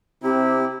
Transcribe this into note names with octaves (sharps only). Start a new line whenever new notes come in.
C3 C4 E4 G4